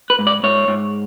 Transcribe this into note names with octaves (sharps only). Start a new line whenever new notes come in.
B4
G#2
D5
G#2 C#5
G#2